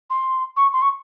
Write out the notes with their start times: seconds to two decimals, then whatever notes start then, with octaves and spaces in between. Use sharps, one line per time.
0.10 C6
0.57 C#6
0.73 C6
0.82 C#6